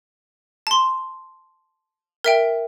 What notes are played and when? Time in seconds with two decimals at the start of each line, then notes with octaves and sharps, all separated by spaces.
0.67 A5 C6
2.24 A#4 E5 G5